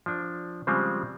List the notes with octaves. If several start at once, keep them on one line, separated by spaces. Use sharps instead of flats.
F3 D4
C#3 F3 G3 G#3 C4